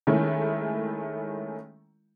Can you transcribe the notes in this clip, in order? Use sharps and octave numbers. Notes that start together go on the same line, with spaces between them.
D#3 G#3 A3 C#4 E4